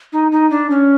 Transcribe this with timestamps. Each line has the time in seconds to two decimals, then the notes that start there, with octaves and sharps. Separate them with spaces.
0.13 D#4
0.32 D#4
0.50 D4
0.70 C#4